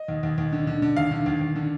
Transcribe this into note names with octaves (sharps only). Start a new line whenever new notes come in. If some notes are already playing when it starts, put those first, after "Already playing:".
Already playing: D#5
D#2
D#2
D#2
D3
D3
D3
D#2 F5
D3
D#2
D#2
D3